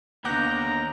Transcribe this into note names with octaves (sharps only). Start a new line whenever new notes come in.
D#2 D3 B3 F#5 A#5 D6 G6